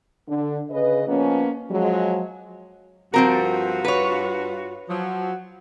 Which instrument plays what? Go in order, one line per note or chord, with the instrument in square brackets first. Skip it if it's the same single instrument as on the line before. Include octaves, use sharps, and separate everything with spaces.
[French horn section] D3
C#3 B4 D#5
F3 A#3 B3 C#4
F3 F#3 G#3
[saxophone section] G2 F4 F#4 [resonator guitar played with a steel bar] F3 C4 A#4
[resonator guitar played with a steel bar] B4 C#5
[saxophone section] F3 F#3